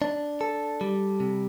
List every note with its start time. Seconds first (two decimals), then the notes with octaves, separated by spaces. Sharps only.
0.02 D4
0.41 A4
0.81 G3
1.20 C3